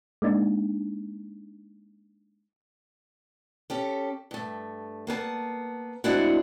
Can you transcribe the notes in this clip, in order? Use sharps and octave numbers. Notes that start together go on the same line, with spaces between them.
G#3 A#3 D4 D#4
C#4 G4 A4
G2 A3
A#3 B3 A#4 A5
G#3 A3 C4 D4 E4 F#4